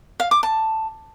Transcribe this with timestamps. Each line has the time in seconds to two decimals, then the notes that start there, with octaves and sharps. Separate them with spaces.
0.20 F5
0.31 D6
0.43 A5